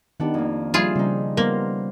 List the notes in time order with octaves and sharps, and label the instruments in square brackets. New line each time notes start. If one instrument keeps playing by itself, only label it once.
[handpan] D#3 D#4 G4 [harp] B3 D4 F#5
[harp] F2 A#3
[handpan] F3 G3 [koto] F4 G#4 [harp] E5 G#5 B5
[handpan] C#3 [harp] G3 D#4
[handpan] G3 B3 A#4 [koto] A#3 [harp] C5